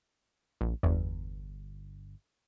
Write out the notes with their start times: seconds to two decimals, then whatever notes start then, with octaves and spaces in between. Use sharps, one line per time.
0.61 A#1
0.83 G1 E2